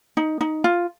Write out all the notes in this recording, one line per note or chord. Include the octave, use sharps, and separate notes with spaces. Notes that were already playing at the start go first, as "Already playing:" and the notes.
D#4
D#4
F4